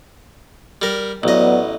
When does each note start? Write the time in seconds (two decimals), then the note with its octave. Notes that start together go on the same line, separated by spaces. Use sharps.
0.82 G3 A#4
1.23 A1 F#3 B3 D5 D#5